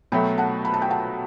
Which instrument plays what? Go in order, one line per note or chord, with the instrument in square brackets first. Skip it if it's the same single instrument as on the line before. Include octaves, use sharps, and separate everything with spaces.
[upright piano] B2 F#3 A3 [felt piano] G5 B5
[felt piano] F#5 A5
B5
A5
G5
F#5 A5